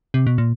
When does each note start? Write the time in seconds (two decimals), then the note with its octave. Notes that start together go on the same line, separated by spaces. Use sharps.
0.14 C3
0.27 B2
0.38 A#2